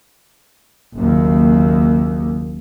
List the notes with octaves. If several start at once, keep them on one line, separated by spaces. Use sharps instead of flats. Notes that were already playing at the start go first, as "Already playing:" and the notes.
F#1 D#2